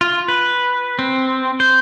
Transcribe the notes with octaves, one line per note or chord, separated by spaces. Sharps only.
F4
B4
C4
C5